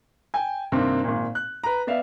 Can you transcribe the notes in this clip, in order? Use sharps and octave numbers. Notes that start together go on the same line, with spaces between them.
G5 G#5
G2 C3 D#3 A#3 C4
G#1 A#2
F#6
B4 A#5
B3 D5 E5 F5